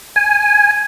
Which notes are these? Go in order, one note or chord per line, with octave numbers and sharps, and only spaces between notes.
G#5